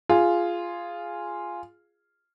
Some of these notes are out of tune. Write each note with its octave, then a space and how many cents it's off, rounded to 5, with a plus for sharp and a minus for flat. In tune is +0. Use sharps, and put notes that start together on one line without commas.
F4 -5 G#4 +0